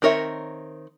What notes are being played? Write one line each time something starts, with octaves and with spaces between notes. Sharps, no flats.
D#3 C4 A#4 C#5 E5